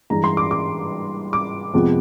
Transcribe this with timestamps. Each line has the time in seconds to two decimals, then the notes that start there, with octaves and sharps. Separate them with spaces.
0.10 G2 E3 G#3 A#5
0.24 C6
0.37 D6
0.51 D6
1.33 D6
1.74 F2 C3 F3 G#3 B3